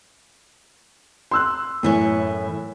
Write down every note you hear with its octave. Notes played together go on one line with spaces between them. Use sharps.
C6 E6 F#6
F#2 A2 E3 C#5